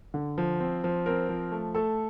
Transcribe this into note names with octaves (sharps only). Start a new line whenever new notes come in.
D3
F3
C4
F3
C4 A#4
F3
A3
A3 A4